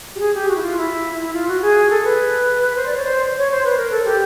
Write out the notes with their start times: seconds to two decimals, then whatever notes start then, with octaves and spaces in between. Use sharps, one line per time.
0.15 G4
0.19 G#4
0.35 G4
0.48 F#4
0.56 E4
0.62 F4
0.77 E4
1.22 E4
1.33 F4
1.48 F#4
1.62 G#4
1.90 A4
2.04 B4
2.76 C5
2.86 D5
2.96 C#5
3.04 C5
3.38 C#5
3.51 C5
3.64 B4
3.77 A#4
3.91 A4
4.05 G4